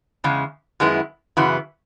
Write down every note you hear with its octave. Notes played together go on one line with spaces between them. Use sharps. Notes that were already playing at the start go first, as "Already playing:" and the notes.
E2 C#3 G#3
F#2 D#3 G#3 B3 E4
F#2 C#3 E3 B3 F#4